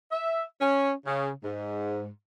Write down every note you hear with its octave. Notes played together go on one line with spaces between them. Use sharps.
E5
C#4
C#3
G#2